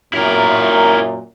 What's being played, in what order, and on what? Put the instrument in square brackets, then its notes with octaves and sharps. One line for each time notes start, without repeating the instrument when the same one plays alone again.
[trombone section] F#2 A#2 [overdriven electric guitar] E4 A#4